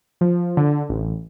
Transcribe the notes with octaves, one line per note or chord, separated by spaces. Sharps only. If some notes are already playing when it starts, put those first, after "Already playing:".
F3
D3
A1